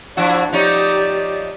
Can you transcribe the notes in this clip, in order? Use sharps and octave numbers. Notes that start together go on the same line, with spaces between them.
F3 D4 E4 F#4
F3 D#4 G4 C#5 D5